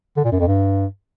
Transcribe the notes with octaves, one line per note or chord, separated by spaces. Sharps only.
D3
A#2
F#2
F2
G2